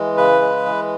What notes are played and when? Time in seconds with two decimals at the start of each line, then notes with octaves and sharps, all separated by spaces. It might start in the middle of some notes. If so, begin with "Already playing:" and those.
Already playing: E3 G#3
0.17 C#3 B4
0.41 G#3
0.65 E3